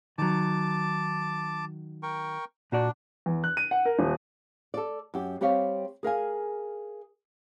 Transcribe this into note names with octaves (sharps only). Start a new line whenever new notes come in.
D#3 F#3 A5 D6
A#4 G5 C#6
A#2 D4 F#4 D5
E2
F#6
D#7
F#5
A#4
D#1
A4 D5
F#2 G4
G3 C4 G4 C#5 F5
G#4 A#4 F5 G#5